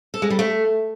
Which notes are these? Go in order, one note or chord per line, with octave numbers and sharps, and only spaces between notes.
A4
G#3
G3
A3